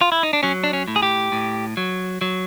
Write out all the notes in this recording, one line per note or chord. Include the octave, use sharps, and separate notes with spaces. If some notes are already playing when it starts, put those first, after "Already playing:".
F4
E4
D#4
D4
F#3 C#4
D4
C#4
A2
G#4
G4
A2
F#3
F#3